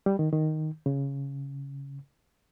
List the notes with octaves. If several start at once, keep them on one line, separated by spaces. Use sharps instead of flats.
G3
D#3
D#3
C#3